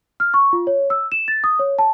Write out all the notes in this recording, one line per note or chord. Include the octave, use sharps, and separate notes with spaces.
F6
C#6
F4
C#5
E6
E7
A6
D#6
C#5
A5